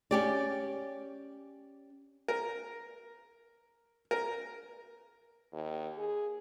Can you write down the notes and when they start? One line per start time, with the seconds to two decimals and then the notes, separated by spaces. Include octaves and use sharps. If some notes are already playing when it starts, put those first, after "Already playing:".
0.11 C#4 G4 D5
2.28 A#4
4.11 A#4
5.53 D#2
5.98 G#4